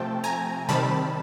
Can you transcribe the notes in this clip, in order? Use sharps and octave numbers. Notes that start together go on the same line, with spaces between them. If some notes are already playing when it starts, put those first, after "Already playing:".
Already playing: C3 F3 A3 C4 G5 A5
G#5 A#5
C3 D#3 G3 C4 A5 B5